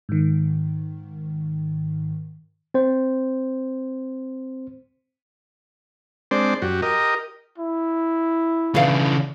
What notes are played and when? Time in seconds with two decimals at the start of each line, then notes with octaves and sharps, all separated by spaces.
0.09 G#2 D#3
2.74 C4 C5
6.31 G#3 C4 D4 C5 D5
6.62 F#2 F#4 G4
6.82 G4 A#4 D#5
7.59 E4
8.75 C#3 E3 D4 F5